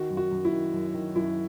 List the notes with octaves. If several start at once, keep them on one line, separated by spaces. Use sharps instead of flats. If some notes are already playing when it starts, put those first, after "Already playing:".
Already playing: D#3 F#4
F#2
F#4
F#2
E4
D#3
F#2
D#3
F#2 E4